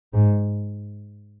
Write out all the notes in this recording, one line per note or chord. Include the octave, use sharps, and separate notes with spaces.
G#2